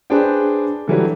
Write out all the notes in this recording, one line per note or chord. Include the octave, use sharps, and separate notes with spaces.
D4 G#4 B4 C5 D5 G5
D3 E3 F#3 G3